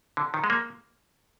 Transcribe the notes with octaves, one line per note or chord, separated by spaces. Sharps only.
D3
D#3
G#3
A#3